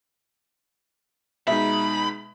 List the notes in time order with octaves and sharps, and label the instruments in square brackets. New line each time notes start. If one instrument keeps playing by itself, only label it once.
[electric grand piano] B2 G#3 D#4 [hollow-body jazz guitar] E5 [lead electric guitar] B5